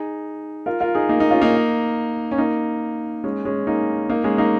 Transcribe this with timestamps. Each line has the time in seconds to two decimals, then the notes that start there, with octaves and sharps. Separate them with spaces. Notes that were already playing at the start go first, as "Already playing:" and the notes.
Already playing: D#4 G#4
0.66 F4 A#4
0.81 F4 A#4
0.95 D#4 G#4
1.09 A#3 D#4
1.20 A#3 D#4
1.31 C#4 F4
1.41 A#3 D#4
2.31 C#4
2.38 A#3 D#4
3.24 G#3 C#4
3.45 G#3 C#4
3.67 A#3 D#4
4.09 A#3 D#4
4.24 G#3 C#4
4.38 A#3 D#4